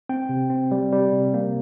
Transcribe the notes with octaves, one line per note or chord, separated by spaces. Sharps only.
C4 G5
C3
C4
G3
G3
C3
A#3